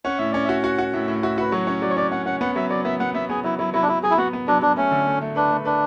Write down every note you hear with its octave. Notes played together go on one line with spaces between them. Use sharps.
C#4 F#5
A2 E5
C#4 D5
F#4 E5
F#4 F#5
F#4
A2 E5
A2
F#4 E5
F#4 B4
F#3 C#5
C#4
F#3 D5
C#5
C#4 D5
C#4 F#5
C#4 F#5
B3 F#5
F#3 E5
F#3 D5
B3 E5
B3 F#5
B3 E5
B3 G#4
F#3 E4
F#3 E4
F#3 E4
D4
F#3 E4
F#3 G#4
E4
B3 F#4
B3
F#3 D4
F#3 D4
A3 C#4
D3
A3
A3
D4 B4
A3
D4 B4